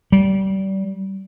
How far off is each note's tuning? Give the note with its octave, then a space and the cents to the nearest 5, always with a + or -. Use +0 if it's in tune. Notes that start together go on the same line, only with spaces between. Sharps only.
G3 -25